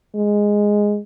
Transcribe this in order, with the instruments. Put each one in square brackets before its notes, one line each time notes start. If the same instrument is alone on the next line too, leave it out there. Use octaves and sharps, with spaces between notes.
[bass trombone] G#3